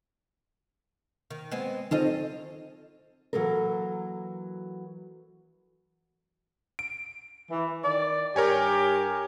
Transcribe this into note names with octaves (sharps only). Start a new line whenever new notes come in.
D#3
G#3 B3 C4
D#3 C4 F4 A4 D#5
E3 F#3 A#3 A4 A#4
D7
E3
D#3 D5
G2 G4 A#4 C#5 G#5